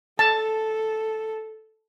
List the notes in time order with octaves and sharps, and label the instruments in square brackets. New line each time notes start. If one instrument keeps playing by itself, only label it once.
[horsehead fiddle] A4 [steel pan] A5